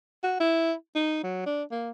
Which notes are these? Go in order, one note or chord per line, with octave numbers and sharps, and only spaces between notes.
F#4
E4
D#4
F#3
D4
A#3